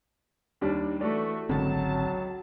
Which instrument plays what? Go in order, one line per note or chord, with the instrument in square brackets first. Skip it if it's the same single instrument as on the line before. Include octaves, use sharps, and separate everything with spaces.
[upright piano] D#2 G3 D4
[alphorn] E3 [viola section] A3 F#4 [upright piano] D5
[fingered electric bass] G#1 D3 C4 [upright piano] C#2 [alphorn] F#3 [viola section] A5